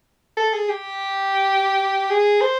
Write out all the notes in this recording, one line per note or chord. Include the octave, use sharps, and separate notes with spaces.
A4
G#4
G4
G#4
C5